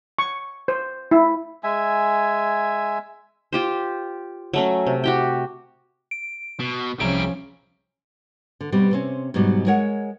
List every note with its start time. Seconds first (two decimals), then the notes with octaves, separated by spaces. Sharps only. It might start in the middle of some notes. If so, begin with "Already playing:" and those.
0.19 C#6
0.68 C5
1.11 E4
1.64 G#3 E5 G#5
3.53 F4 G4 C5
4.54 F#3 A3 C#4
4.87 C3
5.04 F#4 G4 G5
6.11 D7
6.60 B2
7.00 C2 F3 G3 C#4 G#4 E5 A#5 D7
8.60 D3
8.72 B2 G3 C4
8.91 C3 C4 C#4
9.34 G#2 B2 F#3 G3
9.67 G#3 A#4 C#5 F#5